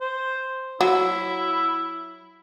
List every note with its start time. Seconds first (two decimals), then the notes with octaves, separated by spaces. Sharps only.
0.01 C5
0.81 F#3 E4